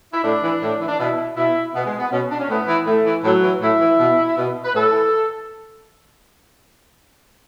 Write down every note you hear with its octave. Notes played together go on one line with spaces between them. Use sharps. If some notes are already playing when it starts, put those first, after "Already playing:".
E4
A2 D4
E3
A2
E3
D4
B2 E4
B2 E4
B2 B3
G#3
B3
B2 C#4
D4
C#4
A2 B3
E3
A2 A3
E3
A2 F#3
E3
A2 E4
E3
B2
B2
B4
A2 A4
E3